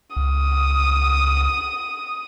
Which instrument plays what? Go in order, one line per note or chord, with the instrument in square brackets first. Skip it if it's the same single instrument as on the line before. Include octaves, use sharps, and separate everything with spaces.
[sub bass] C#2 [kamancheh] D#6